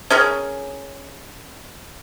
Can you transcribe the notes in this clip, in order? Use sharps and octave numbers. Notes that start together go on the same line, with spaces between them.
C#4 G#4 A#4